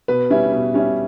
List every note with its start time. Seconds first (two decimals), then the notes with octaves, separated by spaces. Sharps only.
0.08 B2 B4
0.30 G3 C#4 E4
0.52 B2
0.74 G3 C#4 E4